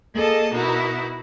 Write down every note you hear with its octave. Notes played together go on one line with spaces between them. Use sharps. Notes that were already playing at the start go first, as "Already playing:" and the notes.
A#3 G#4 A4 D#5 A5
B2 D#4 E4 F#4 A#4